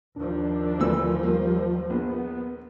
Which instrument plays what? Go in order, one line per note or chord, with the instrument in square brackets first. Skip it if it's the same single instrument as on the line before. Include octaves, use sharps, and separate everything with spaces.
[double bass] D#2 F3 [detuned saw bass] D4
[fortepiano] D2 E3 E6
[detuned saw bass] G3 [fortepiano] A#3
[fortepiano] A#1 [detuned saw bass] B3